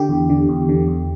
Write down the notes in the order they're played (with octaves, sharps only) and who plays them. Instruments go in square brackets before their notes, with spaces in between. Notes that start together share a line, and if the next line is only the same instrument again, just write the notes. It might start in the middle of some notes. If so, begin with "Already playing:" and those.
Already playing: [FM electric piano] D3 G4
E2
D3
E2
D3
E2